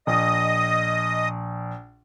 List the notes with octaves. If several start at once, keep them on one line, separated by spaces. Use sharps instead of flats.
A#1 D#5 D#6